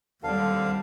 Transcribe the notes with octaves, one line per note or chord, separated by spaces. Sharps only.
D#2 D3 G3 C4 F5 A5